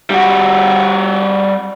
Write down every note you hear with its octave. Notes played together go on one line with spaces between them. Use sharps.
G3 F#4